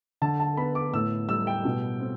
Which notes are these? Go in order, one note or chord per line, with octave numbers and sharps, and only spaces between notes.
D3 A5
A5
B3 B5
D6
A2 E6
G3 E6
G5
B2
C4